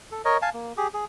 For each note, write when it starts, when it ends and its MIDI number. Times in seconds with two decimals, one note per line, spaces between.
0.11 0.22 69
0.25 0.37 70
0.25 0.37 73
0.25 0.37 75
0.42 0.50 77
0.42 0.50 80
0.42 0.50 81
0.54 0.73 58
0.77 0.88 67
0.77 0.88 68
0.94 1.05 68